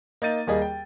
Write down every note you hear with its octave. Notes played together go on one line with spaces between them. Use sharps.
A#3 D#4 G6 A6 D#7
D#2 G3 A#3 G#4 D#5
G5